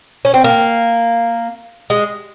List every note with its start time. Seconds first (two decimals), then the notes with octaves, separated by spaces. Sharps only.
0.25 C#4
0.34 C4
0.44 A#3
1.90 G#3